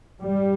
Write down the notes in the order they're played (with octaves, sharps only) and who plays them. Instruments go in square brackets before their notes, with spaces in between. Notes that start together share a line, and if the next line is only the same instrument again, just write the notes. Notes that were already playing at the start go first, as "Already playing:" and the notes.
[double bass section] G2 G3